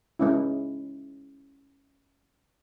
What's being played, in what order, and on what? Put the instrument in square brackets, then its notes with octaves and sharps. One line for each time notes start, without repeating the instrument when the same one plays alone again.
[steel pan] G#3 C#4 E4